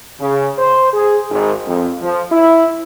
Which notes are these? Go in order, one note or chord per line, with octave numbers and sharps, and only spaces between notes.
C#3
C5
G#4
G#1
F2
F3
E4